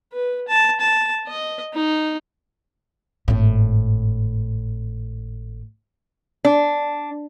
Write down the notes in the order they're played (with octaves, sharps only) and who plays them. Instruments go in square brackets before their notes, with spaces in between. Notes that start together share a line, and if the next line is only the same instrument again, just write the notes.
[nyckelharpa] B4
A5
A5
D#5
D#4
[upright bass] G#1 A2
[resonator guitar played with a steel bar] D4